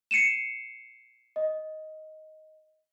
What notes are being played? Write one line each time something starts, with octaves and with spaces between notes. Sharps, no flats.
C7 C#7 D#7 E7
D#5